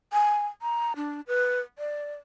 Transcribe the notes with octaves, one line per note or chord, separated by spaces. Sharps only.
G#5
A#5
D4
B4
D5